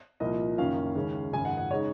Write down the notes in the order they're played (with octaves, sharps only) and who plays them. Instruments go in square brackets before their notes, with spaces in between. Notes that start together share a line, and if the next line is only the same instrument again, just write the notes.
[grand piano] C2 A#2 F3 A#3 D#5
F#1 F#2 D#3 A#3 C#4 F5
D#2 C#3 G#3 C#4
G#1 F#2 C#3 G#5
F#5
F#5
C#3 G#3 D#4 C#5